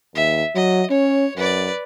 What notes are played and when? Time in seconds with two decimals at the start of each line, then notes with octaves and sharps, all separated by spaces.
0.15 D#2 E5
0.55 F#3 D#5
0.91 C#4 C#5
1.37 F#2 B4 D5